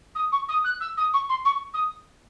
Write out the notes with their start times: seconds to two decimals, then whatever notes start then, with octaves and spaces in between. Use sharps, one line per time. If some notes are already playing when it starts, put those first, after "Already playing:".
0.15 D#6
0.32 C#6
0.49 D#6
0.64 F#6
0.80 E6
0.97 D#6
1.13 C#6
1.29 C6
1.45 C#6
1.74 D#6